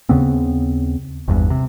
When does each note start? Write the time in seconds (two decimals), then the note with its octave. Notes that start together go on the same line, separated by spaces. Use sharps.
0.09 D#2 C#3 B3 C4
1.28 G#1 E2 G2
1.50 C3